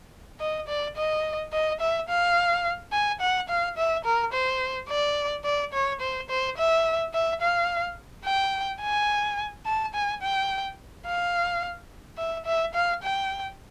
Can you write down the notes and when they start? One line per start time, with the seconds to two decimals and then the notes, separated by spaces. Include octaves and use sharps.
0.40 D#5
0.68 D5
0.96 D#5
1.53 D#5
1.80 E5
2.09 F5
2.92 G#5
3.21 F#5
3.49 F5
3.77 E5
4.05 A#4
4.33 C5
4.89 D5
5.44 D5
5.73 C#5
6.01 C5
6.30 C5
6.57 E5
7.14 E5
7.41 F5
8.25 G5
8.81 G#5
9.66 A5
9.94 G#5
10.22 G5
11.06 F5
12.18 E5
12.45 E5
12.74 F5
13.03 G5